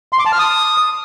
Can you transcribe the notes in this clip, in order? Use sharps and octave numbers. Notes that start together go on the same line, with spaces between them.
C6
D6
A5
F6
D#6